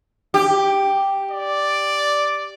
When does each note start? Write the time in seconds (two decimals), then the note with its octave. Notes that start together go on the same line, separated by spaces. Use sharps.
0.34 G4
1.31 D5